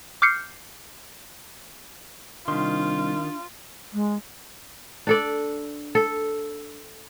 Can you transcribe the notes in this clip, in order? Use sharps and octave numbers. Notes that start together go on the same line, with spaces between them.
D6 F6 G6 C7 C#7
C2 D#3 D4 F4 C6
G#3
D4 A4 D5
A4